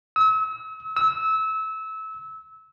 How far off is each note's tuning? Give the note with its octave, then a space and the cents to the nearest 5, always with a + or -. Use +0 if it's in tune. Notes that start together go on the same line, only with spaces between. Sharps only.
E6 -40
E6 -25